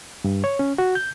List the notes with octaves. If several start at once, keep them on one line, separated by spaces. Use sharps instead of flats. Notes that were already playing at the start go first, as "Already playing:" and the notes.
G2
C#5
C#4
F#4
G6